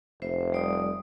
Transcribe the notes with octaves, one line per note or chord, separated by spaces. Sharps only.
F1 C5 E5
G3 D5 D#6